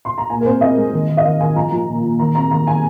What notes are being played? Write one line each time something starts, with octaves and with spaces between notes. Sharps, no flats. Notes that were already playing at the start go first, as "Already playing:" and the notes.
C6
A#5
A#2 G#5
A#4
C4 C5
C4 D#5
G#3
D#3
D#3
D#5
D#3 F5
D#3 G#5
F3 A#5
F3
A#2
A#2
D#3 A#5
C4 A#5
D#3 A#5
D#3 G#5